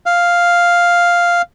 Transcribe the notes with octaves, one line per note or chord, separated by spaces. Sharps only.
F5